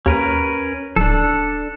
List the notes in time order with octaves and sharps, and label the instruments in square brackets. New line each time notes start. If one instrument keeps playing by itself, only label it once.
[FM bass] D#2 [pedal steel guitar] C#4 A#4 B4
[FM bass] D1 [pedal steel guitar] D4 A4